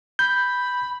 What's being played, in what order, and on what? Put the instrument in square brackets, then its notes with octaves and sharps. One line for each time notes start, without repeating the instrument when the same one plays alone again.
[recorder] B5 [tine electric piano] G6